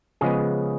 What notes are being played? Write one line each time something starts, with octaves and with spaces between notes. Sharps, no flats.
C#3 F3 G#3 B3 G#4